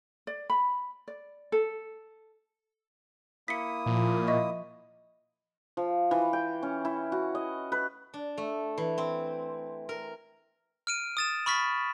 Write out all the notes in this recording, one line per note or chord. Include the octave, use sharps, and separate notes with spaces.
D5
B5
D5
A4
A#3 E4 D#6 B6 C#7
A#2 F3
D#5 E5 C#6
F3
E3
G5
C#4
E4
F#4
D#5
B4
D4
A3
E3
C4
A#4
F6 D7 D#7
D#6 A6 E7
B5 C#6 F6 A6 B6